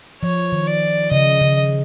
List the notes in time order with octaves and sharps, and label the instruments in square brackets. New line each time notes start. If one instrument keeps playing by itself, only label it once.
[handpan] F3 [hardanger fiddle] C#5
[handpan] D#3
[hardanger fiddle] D5
[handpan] C#3 [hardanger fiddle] D#5
[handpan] C#3